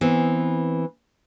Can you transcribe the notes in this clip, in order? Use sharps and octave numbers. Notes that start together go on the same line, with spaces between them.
E3 B3 C4